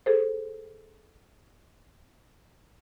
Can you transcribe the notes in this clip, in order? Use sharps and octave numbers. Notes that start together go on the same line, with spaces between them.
G#4 A4 C5